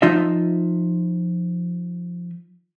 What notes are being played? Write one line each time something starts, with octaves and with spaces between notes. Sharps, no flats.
F3 D#4 F4 D#5 E5